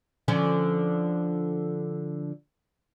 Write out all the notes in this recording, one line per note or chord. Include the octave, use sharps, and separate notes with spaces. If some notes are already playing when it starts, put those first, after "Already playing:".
D3 F3 C#4